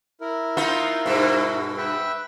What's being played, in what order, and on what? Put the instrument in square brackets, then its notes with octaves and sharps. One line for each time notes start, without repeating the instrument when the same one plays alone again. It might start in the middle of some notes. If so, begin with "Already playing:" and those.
[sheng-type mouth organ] E4 A#4
[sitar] B3 D#4 F4
G2 B2
[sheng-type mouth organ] B4 E5 G5